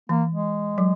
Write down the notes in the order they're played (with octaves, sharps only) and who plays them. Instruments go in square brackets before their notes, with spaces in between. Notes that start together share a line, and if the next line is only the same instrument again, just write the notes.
[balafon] E3 [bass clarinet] A#3
[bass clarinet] G#3
[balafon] F#3